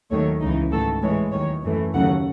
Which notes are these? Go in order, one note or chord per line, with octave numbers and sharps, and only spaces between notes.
D#2 D#3 F#3 A3 C#5
C#2 C#3 E3 D#4
G#2 D#3 F#3 A3 A4
A2 E3 G#3 C#5
D#2 D#3 F#3 C#5
F#2 E3 A3
D#2 C#3 F#3 A3 F#5